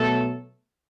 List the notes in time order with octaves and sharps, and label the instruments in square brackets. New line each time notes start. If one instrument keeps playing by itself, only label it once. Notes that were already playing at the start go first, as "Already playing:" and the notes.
Already playing: [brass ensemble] B2 F#3 A3 A4